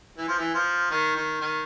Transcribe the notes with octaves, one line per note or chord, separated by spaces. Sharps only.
E3
F3
E3
F3
D#3
D#3
D#3